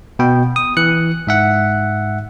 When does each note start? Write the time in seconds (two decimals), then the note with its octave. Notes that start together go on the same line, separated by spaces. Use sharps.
0.19 B2 G5
0.56 D#6
0.77 E3 F#6 C#7
1.27 G#2 E5 F#5